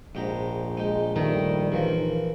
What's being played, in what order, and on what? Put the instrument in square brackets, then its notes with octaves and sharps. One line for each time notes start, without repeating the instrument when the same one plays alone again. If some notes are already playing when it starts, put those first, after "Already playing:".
[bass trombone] A#1 [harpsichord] G#2 G4 A#5
[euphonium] G#3 [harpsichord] D#4 G4
[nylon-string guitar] D#3 [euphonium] G3 [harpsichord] A3
[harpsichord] E3 F3 A#3 [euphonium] A#4